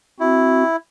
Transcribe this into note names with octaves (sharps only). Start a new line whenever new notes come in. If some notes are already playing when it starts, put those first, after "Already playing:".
C4 E4 F#4